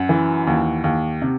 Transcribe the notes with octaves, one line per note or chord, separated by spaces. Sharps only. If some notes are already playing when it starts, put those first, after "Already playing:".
Already playing: F#2 F#5
E3
D#2
D#2
C3